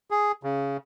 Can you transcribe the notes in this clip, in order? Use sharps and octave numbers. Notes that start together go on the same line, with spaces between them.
G#4
C#3